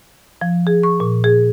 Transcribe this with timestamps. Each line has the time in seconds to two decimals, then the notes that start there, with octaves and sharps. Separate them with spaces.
0.41 F3
0.67 G#4
0.83 C#6
1.00 A#2
1.24 G#4